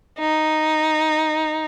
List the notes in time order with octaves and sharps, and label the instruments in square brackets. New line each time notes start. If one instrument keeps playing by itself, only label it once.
[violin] D#4